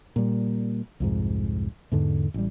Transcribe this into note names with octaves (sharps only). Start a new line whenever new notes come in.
A#2 G3
C2 F2 G#2
E2 G#2 D3
A1 G3